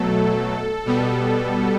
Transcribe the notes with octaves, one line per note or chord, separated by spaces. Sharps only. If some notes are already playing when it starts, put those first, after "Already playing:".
Already playing: B2 F#3 A3 A4
B2 G3 B3